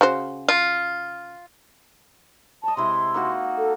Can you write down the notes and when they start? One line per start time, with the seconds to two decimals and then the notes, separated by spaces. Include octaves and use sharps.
0.01 C#3 F#4 C5
0.49 F4
2.63 C#5 D#5 A5
2.77 C3 G#3 E4 C6
3.14 A#3 D#4 F#4
3.58 A4